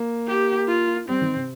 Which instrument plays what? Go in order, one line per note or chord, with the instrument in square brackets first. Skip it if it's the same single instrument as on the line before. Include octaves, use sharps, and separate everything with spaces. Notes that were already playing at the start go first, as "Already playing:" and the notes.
Already playing: [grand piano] A#3
[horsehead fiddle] G4
F4
[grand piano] G3 [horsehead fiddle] C4
[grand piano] D#3
C3